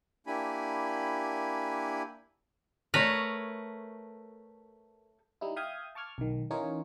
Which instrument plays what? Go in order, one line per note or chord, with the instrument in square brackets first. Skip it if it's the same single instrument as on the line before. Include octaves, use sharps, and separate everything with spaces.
[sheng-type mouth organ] A#3 D4 E4 G4 G#5 B5
[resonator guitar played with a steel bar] A3 C#5 [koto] A#4 B4
[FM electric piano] G3 D#4 E4
E5 F5 G5 D#6 G6 G#6
A5 C#6 D6 F6 G#6
B1 D#3
E3 C#4 D#4 F4 A#4 C#5